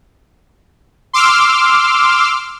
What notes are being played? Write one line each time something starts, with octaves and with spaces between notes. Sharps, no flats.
C6 D6 E6 F6